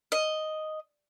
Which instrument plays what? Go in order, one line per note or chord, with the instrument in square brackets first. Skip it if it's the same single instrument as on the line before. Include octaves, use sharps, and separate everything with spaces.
[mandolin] D#5